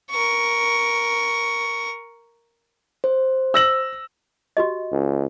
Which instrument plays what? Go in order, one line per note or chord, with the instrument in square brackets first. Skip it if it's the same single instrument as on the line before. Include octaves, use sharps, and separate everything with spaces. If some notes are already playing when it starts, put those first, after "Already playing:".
[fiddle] A#4 C#6
[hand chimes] C5
[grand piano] E6 A#6 F#7
[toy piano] F#4 G4 D#5
[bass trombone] C#2